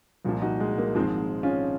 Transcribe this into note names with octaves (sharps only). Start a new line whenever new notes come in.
C2 A#2 F3
D#4 F#4
G#3
A#3
G#1 G#2 F3 G#3 C4
C#4 F4